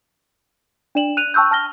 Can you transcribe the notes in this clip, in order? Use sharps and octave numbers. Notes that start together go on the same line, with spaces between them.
D4 D5 E7 F#7
F#6 D#7 F7
G5 A5 C#6 E6 F#6 G6
A5 F6 A#6 G7